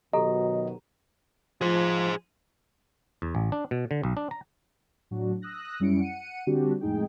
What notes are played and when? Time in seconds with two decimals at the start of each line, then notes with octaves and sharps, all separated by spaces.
0.13 B2 D#3 F#3 G4 A4 D#5 A#5
1.61 F3 G#4 C5
3.22 E2
3.35 A1
3.52 D4
3.71 B2
3.91 D3
4.03 B1
4.17 D4
4.31 A#5
5.11 A2 F#3 D4 F#4
5.42 D#6 E6 F#6 A#6
5.80 F#2 G3 C#4 E4 C#7 D7
6.00 F#5 C#7 D#7
6.47 D3 G3 C4 D4 F#4 G4
6.81 F2 A2 G#3 D#4 G#4 G5